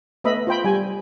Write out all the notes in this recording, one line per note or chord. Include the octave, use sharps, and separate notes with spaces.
A3 B3 D#5 E5 B5
F4 C5 G5 B5
G3 G#5